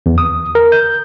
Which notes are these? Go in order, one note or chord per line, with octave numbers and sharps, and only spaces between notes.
E2
D#6
A#4
G6